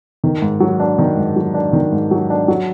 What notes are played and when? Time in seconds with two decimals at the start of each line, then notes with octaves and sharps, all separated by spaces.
0.24 D#3
0.42 G#2
0.60 F#3
0.80 D4
0.99 D#3
1.17 G#2
1.36 F#3
1.54 D4
1.73 D#3
1.92 G#2
2.11 F#3
2.30 D4
2.48 F#3